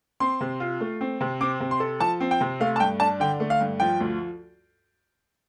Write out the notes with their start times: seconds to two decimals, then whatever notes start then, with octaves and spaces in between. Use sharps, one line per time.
0.20 C4 C6
0.41 C3
0.60 F4
0.81 A3
1.01 C4
1.21 C3
1.41 C4 D6
1.60 C3
1.71 C6
1.80 A4
2.00 F3 A5
2.20 C4
2.31 G5
2.41 C3
2.60 A3 F5
2.76 A5
2.80 G2 G5
3.00 D4 A5
3.20 D3 G5
3.40 A3
3.50 F5
3.61 G2
3.80 F3 G5
4.00 D2